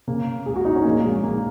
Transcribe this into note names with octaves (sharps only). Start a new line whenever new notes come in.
C#3 A#3
C#2 G#4
F#4
D#4
C#4
A#1 A#3
G#3
A#1 A#3